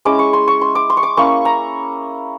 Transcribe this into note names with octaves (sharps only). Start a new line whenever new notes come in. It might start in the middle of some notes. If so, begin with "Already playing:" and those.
G#3 C#4 E4 D6
C#6
C6
C#6
C6
D6
C6
C#6
D6
A#3 C#4 E4 C#6
A#5